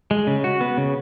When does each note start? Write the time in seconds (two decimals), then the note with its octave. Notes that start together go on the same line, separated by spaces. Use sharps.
0.11 G#3
0.27 C#3
0.44 F#4
0.61 B3
0.77 C#3